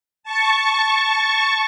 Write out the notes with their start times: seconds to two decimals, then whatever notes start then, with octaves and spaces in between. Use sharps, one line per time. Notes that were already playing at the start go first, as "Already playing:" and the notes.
0.23 A5 C#6